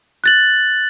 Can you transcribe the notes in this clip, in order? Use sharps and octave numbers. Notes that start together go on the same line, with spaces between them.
F#6 A6 F#7